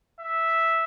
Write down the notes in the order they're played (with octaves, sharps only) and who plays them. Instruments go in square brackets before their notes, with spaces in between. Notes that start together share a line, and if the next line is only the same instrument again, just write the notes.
[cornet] E5